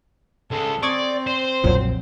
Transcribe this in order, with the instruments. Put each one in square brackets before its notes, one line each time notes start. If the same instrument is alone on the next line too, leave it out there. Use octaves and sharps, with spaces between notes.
[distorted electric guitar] C#2 G#3 [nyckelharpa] A4
[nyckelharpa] C4 [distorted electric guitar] D5 [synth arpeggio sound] C#6 D#6 G#6
[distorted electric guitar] C5
[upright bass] B1 F2 [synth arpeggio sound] A#2 F#3